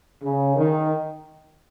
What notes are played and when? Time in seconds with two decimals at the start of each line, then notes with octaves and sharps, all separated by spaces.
0.22 C#3
0.56 D#3